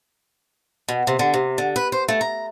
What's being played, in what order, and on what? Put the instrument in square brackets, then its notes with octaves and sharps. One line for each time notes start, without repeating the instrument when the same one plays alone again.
[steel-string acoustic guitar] B2
C3
D3
C3
D3
B4
C5
A3
A#5